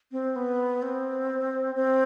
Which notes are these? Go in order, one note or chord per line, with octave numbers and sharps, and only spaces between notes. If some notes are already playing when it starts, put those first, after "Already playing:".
C4
B3
C4
C4